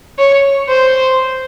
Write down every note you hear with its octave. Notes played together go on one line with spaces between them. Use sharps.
C#5
C5